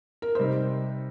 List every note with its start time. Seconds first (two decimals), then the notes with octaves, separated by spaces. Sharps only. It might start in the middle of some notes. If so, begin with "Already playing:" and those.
0.22 A#4
0.35 C3 G3 D#4 C5